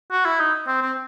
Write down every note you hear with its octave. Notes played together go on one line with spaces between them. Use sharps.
F#4
E4
D#4
C4
C4